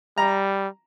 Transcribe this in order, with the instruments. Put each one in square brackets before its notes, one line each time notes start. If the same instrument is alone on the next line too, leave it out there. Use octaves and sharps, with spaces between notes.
[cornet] G3 [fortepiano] A#5